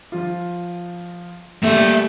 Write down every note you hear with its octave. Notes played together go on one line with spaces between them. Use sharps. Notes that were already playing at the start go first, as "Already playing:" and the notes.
F3 F4
G3 A3 A#3 E5